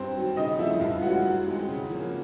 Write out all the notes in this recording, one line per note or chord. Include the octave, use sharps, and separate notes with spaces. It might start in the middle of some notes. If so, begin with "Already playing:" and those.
Already playing: G2 C4 C5
D#3 F#3
C#3 D#4 D#5
F3 A3 E4 E5
G2 F4 F5
E3 G#3 C#4 F#4 F#5
F#2
D#3 G#3 C4
C#3
F3 A#3 C#4